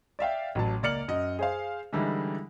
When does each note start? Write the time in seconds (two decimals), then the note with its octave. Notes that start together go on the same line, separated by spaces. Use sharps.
0.19 D5 E5 F5 G5
0.55 A1 F#3 A5
0.82 C#2 A#3 D5 F6 C#7 F#7
1.08 F#2 D#5
1.39 G#4 C5 F5
1.93 D3 E3 G3 G#3 D#4 E4